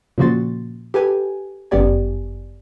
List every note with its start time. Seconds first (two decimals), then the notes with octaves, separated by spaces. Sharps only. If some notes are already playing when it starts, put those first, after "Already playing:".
0.18 A#2 C#3 F3 F#4 C6 A6
0.94 G4 A4 B4 G#5
1.71 G1 F#2 B3 G4 D5 G#5